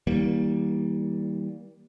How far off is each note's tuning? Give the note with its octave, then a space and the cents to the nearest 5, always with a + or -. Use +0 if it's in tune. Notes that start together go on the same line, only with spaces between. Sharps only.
D#3 +45 G3 -5 A#3 +15